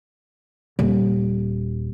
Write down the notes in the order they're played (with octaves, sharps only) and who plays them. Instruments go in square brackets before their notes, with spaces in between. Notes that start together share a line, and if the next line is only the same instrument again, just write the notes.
[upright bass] D#1